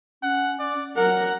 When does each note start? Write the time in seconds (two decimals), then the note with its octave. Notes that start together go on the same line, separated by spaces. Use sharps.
0.23 C#4 F#5
0.59 D5
0.96 F#3 A#4 F#5